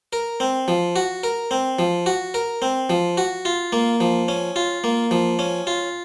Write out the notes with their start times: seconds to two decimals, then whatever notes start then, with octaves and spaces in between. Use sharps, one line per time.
0.13 A#4
0.40 C4
0.68 F3
0.96 F#4
1.23 A#4
1.51 C4
1.79 F3
2.06 F#4
2.34 A#4
2.62 C4
2.90 F3
3.17 F#4
3.45 F4
3.72 A#3
4.00 F3
4.28 C#4
4.56 F4
4.84 A#3
5.11 F3
5.39 C#4
5.67 F4